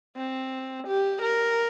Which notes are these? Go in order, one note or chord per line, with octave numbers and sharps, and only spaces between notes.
C4
G4
A#4